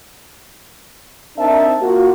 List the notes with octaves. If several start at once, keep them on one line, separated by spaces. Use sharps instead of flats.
C4 D4 D#4 A#4 E5 A5
A#3 F4 F#4